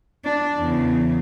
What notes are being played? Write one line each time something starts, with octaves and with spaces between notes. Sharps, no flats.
D4
E2 C#3